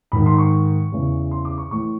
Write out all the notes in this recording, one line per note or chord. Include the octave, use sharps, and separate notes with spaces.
G#2 D#3 B5
C6
C#6
E2 C#3 E3
C6
D6
C#6
A2 E3 C#6